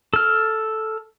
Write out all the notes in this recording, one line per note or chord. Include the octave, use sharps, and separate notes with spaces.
A4 F6